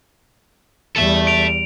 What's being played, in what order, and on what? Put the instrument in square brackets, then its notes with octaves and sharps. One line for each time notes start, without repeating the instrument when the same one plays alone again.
[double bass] E2 G3 [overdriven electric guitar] A4 E5
[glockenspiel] D7 F7